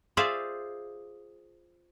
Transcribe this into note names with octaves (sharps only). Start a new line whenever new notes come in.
F4 G#4 C5 D5 E5 F5